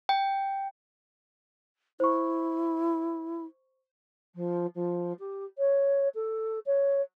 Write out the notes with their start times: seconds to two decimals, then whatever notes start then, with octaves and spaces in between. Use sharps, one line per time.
0.09 G5
2.00 E4 C5 C#6
4.35 F3
4.75 F3
5.19 G4
5.58 C#5
6.14 A4
6.66 C#5